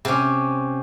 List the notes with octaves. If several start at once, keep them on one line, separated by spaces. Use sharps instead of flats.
C3 C#4